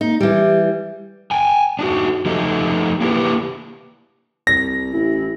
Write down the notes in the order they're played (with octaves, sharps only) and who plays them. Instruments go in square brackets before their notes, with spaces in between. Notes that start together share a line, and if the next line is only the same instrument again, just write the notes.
[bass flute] A#3 [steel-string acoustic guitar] D#4
[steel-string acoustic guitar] E3 G3 [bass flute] G4
[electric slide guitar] G5 G#5
D4 D#4 F#4
F3 A3 D#4 G4 D#5
A#3 D4 E4 F#4 G4 B4
[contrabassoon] C2 [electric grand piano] A#6
[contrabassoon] A1 [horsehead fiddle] E4